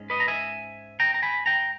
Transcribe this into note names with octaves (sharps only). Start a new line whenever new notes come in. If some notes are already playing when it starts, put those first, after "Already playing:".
Already playing: G#2 G#3 C#4
B4 D#5
A#5
E5 G#5
G5 A#5
A#5
G#5 B5
G5 A#5